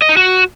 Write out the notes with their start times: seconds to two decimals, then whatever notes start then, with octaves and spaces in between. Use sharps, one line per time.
0.02 D#5
0.09 D#4
0.17 F#4